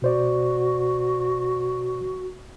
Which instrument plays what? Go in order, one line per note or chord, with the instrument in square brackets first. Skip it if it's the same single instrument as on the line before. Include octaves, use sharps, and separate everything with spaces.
[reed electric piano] B2 C5 D5 [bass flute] F#4